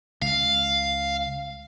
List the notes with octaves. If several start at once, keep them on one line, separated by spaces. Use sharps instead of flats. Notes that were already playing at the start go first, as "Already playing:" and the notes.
C#2 F5